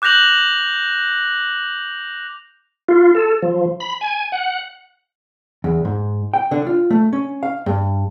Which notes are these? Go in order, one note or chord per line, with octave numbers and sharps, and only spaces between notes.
D6 F#6 G6 A#6 F7 F#7
F4
A4
F3
B5
G#5
F#5
E2
G#2
G5
D3
F4
A3
C#4
F5
G2